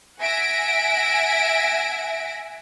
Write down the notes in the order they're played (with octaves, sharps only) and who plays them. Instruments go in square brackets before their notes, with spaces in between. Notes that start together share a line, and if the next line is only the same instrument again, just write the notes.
[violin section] E5 F#5 G#5 A#6 D7